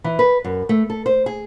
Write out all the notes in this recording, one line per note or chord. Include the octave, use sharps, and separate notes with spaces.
E3
B4
F#2
A3
A4
C5
G#4